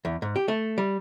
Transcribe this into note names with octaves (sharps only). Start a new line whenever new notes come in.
E2
G#2
G4
A3
G3